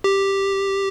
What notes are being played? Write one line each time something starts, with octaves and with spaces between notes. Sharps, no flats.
G4